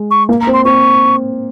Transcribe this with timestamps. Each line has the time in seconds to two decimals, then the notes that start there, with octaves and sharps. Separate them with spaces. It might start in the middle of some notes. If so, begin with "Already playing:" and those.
Already playing: G#3
0.11 C#6
0.29 A#3
0.41 A#5
0.47 C4
0.53 C6
0.65 C4 C#6